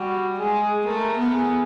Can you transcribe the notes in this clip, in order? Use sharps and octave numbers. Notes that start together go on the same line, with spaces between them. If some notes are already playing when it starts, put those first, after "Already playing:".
Already playing: G3 F#4
G#3 G#4
A3 A#4
B3
G#4